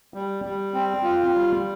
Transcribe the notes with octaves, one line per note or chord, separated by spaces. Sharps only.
G3
G3
C4
F4
G3